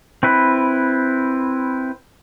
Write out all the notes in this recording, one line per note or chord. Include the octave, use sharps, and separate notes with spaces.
C4 E4 B4